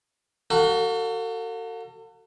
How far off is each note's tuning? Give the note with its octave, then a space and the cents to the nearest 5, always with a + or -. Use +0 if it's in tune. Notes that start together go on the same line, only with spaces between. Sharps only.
F#4 +25 A4 +40 F5 +45